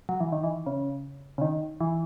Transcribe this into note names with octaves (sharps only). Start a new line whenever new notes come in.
F#3
E3
D#3
E3
C#3
C#3
D#3
E3